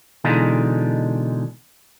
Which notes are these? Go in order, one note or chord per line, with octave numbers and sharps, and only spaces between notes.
B2 D3 E3 G#3 D#4 F4